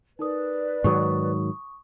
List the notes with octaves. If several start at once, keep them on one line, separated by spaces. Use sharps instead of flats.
D#4 A#4 B4 D5 D#6
G#2 D#3 F#3 C#6 D#6